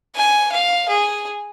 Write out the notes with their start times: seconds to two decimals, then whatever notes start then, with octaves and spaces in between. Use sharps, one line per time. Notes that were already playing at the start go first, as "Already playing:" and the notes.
0.16 G#5
0.52 F5
0.89 G#4